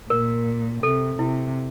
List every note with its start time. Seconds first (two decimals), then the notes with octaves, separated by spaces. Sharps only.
0.10 A#2 A#4
0.83 C3 A4
1.19 C3 E4